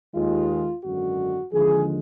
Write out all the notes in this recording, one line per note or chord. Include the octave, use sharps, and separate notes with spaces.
D#2 D#3 G#3 F4
G#1 F#2 D3 G#3 F#4
D#2 D3 F3 G#3 G#4